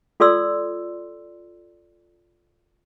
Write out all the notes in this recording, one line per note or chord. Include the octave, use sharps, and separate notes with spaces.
F4 A4 D5 C6 E6